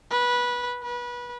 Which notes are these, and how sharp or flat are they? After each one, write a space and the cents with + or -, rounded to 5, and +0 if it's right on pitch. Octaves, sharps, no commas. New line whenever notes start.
B4 -20
B4 -25